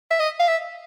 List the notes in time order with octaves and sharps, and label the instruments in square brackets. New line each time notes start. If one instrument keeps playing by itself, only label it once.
[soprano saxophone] E5
D#5
F5
E5